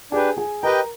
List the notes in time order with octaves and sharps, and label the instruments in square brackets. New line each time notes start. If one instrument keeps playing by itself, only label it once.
[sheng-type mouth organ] D4 G4 B4 [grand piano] G#4 G#5
[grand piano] G#4 G#5
[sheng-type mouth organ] G4 B4 D#5 G5 [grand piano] A#4 A#5